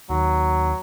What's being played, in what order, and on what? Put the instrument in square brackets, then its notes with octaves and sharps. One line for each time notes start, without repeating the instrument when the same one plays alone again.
[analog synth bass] D#2 [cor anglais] F#3